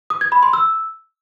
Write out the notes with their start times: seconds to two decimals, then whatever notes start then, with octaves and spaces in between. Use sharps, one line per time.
0.10 D#6
0.21 G#6
0.32 B5
0.43 C6
0.53 E6